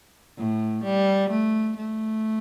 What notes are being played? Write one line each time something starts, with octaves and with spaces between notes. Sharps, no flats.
A2
G3
A3
A3